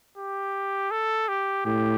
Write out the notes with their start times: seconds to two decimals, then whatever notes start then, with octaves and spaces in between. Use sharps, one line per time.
0.18 G4
0.91 A4
1.29 G4
1.66 A2 G4